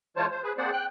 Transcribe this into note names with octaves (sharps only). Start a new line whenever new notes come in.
E3 G#3 F4 C5 C#5 A5
C5
G#4 B4
A#3 C4 G#4 C5 D5 F#5
G5 F#6